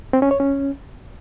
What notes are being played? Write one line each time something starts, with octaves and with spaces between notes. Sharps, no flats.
C4
C#4
C#5
C#4